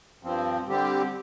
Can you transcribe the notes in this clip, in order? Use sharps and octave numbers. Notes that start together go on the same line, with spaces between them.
G2 F3 C4
D3 G3 C4 G4